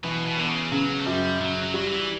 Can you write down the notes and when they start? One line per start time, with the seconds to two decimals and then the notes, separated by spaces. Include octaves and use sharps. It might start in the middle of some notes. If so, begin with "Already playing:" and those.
0.04 B2 E3
0.26 B2
0.38 D3 B3
0.49 C#3
0.72 C#3 F#3
0.99 A3
1.06 F#2 G3
1.40 C#3 F#3
1.63 F#3
1.74 F#3 G3
1.86 E3